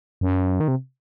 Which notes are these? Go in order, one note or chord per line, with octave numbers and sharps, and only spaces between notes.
F#2
D#3
C3